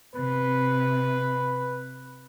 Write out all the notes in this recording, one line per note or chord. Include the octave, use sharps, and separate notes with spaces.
C3 B4